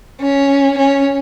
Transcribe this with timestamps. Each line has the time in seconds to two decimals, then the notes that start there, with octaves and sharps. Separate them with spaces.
0.20 C#4
0.77 C#4